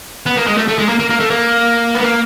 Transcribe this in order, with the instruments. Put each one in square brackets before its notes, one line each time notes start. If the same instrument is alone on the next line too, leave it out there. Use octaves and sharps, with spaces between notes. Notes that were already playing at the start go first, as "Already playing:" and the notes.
[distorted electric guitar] B3
A#3
G#3
A3
A3
G#3
A#3
A#3
A#3
A3
A#3
B3
A#3